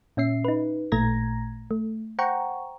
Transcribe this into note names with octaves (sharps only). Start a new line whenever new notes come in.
A#2 C#4 E5 C7
D#4 B4
A1 A#2 A3 A#5 G#6 A#6
A3
C5 F#5 G5 A#5 C#6